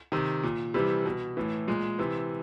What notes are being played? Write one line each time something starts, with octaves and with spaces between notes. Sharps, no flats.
C3 D#3
A#2
C3 E3 G3
B2
A2 E3
A#2 G#3
C3 E3